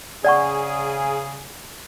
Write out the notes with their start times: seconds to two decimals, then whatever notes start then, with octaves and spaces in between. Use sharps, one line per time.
0.25 C#3 G#4 D5 F#5 C#6